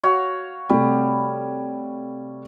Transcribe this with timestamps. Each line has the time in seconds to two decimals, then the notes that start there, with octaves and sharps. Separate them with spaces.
0.03 F#4 C#5 F5
0.69 C3 G3 A3 C4